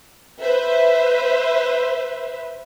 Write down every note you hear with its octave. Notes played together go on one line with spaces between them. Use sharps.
B4 C5 E5